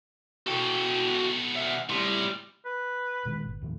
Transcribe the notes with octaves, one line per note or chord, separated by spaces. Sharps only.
B2 F#4 A4 G5
E5 F#5
A2 G3 C6
B4
A#2 D#3 G#3
G1
D#2 A2 F3